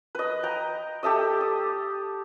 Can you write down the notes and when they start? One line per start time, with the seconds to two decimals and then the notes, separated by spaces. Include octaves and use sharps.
0.15 B4 D#5
0.43 G5 A#5
1.03 G4 A4 E5 D#6
1.41 D#6